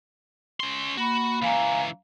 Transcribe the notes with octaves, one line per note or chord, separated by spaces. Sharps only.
C#4 C6
A#3 F#4 B5
C#2 E3 F5 G#5 A#5